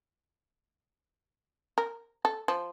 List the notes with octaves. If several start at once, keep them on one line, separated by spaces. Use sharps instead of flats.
A#4
A4
F3